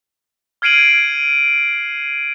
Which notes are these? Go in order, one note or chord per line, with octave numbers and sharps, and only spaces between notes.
F6 G#6 C7 D7 D#7 F#7